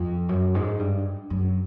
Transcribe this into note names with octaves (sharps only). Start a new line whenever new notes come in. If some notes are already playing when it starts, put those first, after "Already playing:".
Already playing: F2
F#2
G#2
G2
F#2